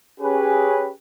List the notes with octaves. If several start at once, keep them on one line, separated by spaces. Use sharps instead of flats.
C#4 G4 G#4 B4